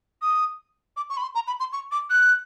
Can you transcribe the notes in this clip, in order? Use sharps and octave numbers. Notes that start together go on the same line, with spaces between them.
D#6
D6
C#6
B5
C6
A#5
B5
C6
C#6
D6
F#6